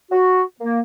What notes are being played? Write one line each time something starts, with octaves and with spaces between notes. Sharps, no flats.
F#4
A#3